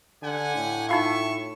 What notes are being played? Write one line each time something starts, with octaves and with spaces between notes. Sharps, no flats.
D3 G4 F#5 G#5
A2
D#4 F4 E5 F5 C#6